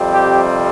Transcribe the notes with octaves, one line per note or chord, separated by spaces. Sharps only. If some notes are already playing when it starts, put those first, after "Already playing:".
Already playing: F2 C3 G3 C4
G4